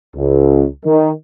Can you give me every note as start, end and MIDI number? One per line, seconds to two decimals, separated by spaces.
0.16 0.66 37
0.85 1.10 51